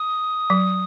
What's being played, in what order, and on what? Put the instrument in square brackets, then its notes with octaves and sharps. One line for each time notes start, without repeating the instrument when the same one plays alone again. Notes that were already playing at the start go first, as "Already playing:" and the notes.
Already playing: [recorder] D#6
[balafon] F#3